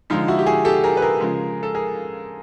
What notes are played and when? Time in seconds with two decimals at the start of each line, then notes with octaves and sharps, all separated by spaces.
0.10 D3 F3 G#3 D#4 F4
0.28 E4 F#4
0.39 G4
0.46 F#4 G#4
0.65 G4 A4
0.84 G#4 A#4
0.97 B4
1.02 G#4 A#4
1.21 C#3 F3 G#3
1.63 A4
1.75 G#4 A#4